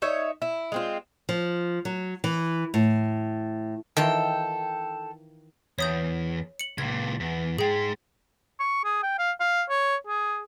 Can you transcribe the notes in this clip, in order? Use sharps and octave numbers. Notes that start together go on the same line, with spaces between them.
D#4 C#5 E5
E4
G#3 C4 F4
F3
F#3
E3
A2
D#3 E3 F4 A4 G5
E2 C#5 D#6 G6
C#7 F#7
C#2 A#2 G#6
E2
G#2 G#3 G#4 G5
C#6
G#4
G5
F5
F5
C#5
G#4